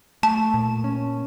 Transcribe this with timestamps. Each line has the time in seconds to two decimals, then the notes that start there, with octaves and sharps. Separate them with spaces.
0.23 A3 A5
0.54 A#2
0.84 C#4